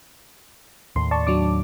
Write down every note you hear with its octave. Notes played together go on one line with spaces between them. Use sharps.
D#2 A2 C6
D5 A5 C#6
F#3 D4 D6